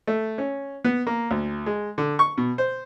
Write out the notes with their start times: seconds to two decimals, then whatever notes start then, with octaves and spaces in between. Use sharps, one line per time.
0.07 A3
0.38 C#4
0.84 B3
1.07 A#3
1.31 D2
1.66 G#3
1.98 D3
2.19 C#6
2.38 B2
2.58 C5